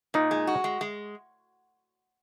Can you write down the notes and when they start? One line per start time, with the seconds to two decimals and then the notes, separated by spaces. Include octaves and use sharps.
0.14 A#2 D#4
0.31 G#3
0.47 F#4
0.64 G#3
0.81 G#3